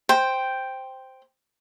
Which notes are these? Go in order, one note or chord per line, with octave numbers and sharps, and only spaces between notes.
C5 G5